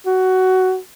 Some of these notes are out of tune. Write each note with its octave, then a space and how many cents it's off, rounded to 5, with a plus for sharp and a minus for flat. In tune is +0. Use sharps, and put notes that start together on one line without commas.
F#4 +15